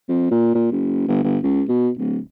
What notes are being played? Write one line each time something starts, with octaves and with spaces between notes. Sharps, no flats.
F2
A#2
A#2
F#1
G1
G1
C#2
B2
D1